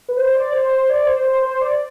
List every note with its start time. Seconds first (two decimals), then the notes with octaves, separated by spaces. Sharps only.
0.09 B4
0.17 C5
0.34 D5
0.52 C5
0.89 D5
1.06 C5
1.24 C5
1.42 C5
1.61 D5